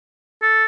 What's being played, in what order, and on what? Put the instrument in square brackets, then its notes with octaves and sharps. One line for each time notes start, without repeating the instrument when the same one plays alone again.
[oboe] A4